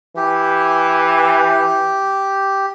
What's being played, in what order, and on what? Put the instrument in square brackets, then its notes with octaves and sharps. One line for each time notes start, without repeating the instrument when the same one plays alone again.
[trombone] E3 [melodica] G4